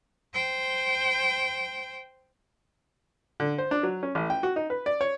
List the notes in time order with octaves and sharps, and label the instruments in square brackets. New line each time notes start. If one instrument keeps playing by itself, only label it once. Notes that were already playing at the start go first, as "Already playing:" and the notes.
[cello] C5 G5
[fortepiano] D3
C5
D4
F#3
C#4
A1
G5
F#4
D#4
B4
D5
C#5